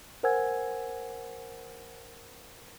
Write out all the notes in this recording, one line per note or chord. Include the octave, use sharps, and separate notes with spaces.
A#4 C5 F#5 G#5 E6 G#6